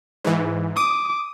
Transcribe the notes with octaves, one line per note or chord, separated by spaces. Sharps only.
G#2 E3
D6 D#6